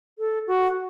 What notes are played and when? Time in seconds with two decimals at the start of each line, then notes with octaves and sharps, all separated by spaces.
0.18 A4
0.47 F#4